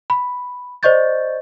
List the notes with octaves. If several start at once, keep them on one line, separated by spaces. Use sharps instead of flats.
B5
C5 D5 D#5 C#6 G6 A6